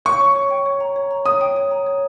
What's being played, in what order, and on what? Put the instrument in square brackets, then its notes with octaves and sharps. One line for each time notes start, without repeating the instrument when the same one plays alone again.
[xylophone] C#5 [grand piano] C#6
[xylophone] C#5
C#5
G5
C#5
A#5
C#5
A#5
[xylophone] C#5 [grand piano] D#6
[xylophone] G5
C#5
A#5
C#5